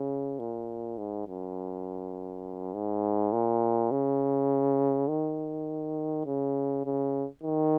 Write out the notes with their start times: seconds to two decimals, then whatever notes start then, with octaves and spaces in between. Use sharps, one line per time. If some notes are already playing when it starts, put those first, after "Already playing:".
Already playing: C#3
0.39 A#2
0.98 G#2
1.27 F#2
2.74 G#2
3.32 A#2
3.91 C#3
5.08 D#3
6.26 C#3
6.85 C#3
7.43 D#3